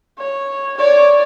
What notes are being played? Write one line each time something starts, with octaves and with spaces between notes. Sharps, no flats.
C#5
C#5 D5